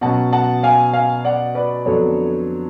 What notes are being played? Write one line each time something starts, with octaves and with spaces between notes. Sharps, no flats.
B2 F#3 C#4 F#5 A5
F#5 A5
F5 G#5
F5 G#5
D5 F#5
B4 D5
F2 D3 F#3 B3 D4 A4 C#5